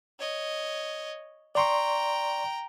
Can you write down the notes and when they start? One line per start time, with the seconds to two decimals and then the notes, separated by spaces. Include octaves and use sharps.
0.20 C#5 D#5
1.55 D5 G5 A#5 C6 C#6